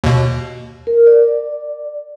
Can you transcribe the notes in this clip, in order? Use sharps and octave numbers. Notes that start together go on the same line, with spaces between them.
D#2 B2
A#4
D5